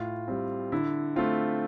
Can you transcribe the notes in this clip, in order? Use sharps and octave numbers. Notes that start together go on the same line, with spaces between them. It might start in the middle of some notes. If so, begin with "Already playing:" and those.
Already playing: A2 F4
G3 C4
D3 E4
A3 C4 F4